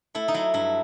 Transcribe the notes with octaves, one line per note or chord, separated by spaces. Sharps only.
A3 E4
D#4
F#3 E4
G2 E4